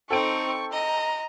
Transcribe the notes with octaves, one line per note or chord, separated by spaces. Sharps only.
C4 D#4 A4 G5 C#6 D7
D#5 A#5